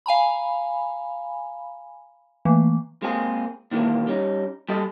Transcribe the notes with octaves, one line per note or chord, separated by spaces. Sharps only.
F5 G#5 A#5 B5
E3 A3 A#3
G#3 A#3 C4 G#4
A#2 D#3 E3 G#3 A#3
G3 C#4 D#4
G3 G4 A4 D#5